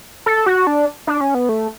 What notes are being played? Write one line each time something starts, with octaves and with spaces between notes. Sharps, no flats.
A4
F#4
D4
D4
C#4
B3
A3